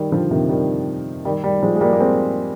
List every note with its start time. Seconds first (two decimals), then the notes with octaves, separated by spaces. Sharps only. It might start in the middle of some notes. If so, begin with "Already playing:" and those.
Already playing: D#3 G3
0.11 D3 F3
0.31 C3 D#3
0.49 D#3 G3
1.25 D#3 G3
1.43 D#3 G3
1.63 F3 G#3
1.76 G#3
1.81 G3 A#3
1.93 A#3
2.00 G#3 C4